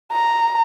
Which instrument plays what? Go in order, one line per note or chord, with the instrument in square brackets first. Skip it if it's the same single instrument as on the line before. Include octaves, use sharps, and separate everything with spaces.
[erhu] A#5